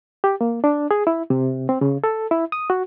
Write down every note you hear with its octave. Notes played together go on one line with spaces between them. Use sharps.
G4
A#3
D4
G#4
E4
C3
C4
C#3
A4
E4
D#6
F#4